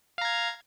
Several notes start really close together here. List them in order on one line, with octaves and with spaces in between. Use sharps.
F5 A#5 G#6